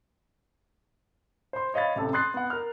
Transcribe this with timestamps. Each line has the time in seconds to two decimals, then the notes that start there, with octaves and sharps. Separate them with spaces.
1.53 C5 C6
1.74 C#5 D#5 F5 B5 A6
1.96 A1 C3 A4 A5
2.13 C6 D#6 F#6 A6 C7
2.34 B3 F#5
2.50 A#4 F6